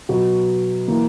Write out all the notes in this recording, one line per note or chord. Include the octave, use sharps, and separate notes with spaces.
B2 F#3 B3 F#4
E3 A#3